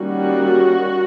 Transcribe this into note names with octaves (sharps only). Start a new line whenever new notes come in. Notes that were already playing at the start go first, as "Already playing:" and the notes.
Already playing: D#3 G3 A#3 C#4 F#4